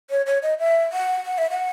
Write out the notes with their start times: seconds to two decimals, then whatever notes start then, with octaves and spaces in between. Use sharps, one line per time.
0.10 C#5
0.26 C#5
0.43 D#5
0.59 E5
0.92 F#5
1.25 F#5
1.38 E5
1.50 F#5